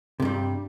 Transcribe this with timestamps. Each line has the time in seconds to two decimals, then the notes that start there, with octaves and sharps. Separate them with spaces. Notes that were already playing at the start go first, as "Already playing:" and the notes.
0.20 C3
0.22 G2
0.25 G3